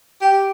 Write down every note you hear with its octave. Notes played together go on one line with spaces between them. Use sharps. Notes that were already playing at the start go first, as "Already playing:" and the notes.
G4